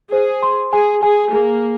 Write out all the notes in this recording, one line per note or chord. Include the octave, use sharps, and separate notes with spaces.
G#4 C5
C6
G#4 G#5
G#4 G#5
A#3 G#4